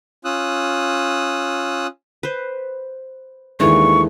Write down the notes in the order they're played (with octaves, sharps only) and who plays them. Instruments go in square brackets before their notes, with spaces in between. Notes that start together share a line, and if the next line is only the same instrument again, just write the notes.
[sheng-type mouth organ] C#4 F4 D#6 E6 F#6
[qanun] B4 C5
[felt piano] D#2 G#3 [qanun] E3 A3 D4 [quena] C#6